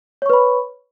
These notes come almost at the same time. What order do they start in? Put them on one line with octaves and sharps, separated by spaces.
C#5 C#6 B4 B5